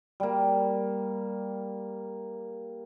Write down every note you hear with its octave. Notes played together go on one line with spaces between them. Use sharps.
G3 A#3